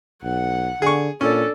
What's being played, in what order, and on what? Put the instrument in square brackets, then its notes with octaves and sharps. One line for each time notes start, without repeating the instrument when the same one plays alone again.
[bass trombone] B1 [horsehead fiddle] F#5
[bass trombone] D3 [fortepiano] G#4 C#6
[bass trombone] A#2 [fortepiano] C#4 [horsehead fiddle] D4 A4